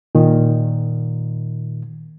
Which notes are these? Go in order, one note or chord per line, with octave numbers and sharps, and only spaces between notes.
A#2 D#3